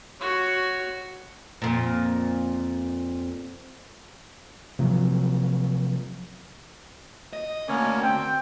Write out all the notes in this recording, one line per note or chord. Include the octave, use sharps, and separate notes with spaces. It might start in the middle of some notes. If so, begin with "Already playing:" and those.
F#4 C#5
F2 A#2
C3 F3 F#3
D#5
D2 A#3 C#4
C4 G5